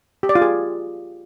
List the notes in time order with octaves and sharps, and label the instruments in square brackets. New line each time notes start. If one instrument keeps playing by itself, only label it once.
[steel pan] G4
D5
F4
G#4